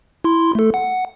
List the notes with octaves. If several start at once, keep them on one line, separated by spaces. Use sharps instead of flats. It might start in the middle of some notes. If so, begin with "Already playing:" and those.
E4 C6
A3 A4
F#5